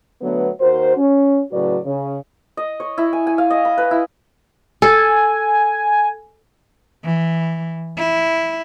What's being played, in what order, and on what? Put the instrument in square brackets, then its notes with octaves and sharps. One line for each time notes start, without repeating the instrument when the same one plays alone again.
[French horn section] D3 F#3 A3 B3
D#2 F#4 A#4 C5
C#4
A2 C#3 F#3 F#4 B4 D5
C#3
[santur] D#5
C#5
E4
G#5
G#5
F5
D#5
B5
B4
E4
[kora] A4 [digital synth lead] G#5
[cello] E3
E4